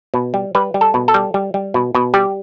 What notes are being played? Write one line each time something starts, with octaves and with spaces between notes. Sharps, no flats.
B2
G3
G3 B4
G3
A4
B2
A4
G3
G3
G3
B2
B2
G3 G4